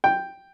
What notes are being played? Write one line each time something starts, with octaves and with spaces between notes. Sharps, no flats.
G5